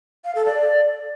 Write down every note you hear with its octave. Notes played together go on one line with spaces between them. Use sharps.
F5
A4
D5